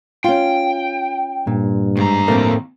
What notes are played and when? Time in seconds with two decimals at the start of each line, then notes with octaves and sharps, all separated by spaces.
0.24 C#4 F4 G5
1.47 G2 A#2
1.97 D#2 G#2 A#5
2.28 F2 A2 A3 A#3 C4